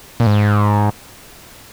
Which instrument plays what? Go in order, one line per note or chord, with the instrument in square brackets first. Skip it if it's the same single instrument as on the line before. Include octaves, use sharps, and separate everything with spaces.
[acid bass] A#2
G#2